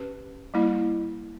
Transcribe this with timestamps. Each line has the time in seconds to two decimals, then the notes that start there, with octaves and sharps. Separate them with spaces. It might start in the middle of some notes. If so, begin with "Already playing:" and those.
Already playing: C#4 G4 B4
0.54 G3 A#3 E4